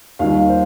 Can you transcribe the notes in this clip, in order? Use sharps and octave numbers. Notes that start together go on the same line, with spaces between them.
D#2 D#3 G3 F5
C5